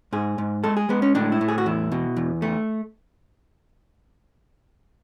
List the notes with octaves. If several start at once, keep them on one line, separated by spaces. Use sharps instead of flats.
G#2 G#4
G#2
G#3 A4
G#4
G#3 B3
C#4
A2 D4
E4
A2
G#4
F#4
E2 E4
B2
E2
A3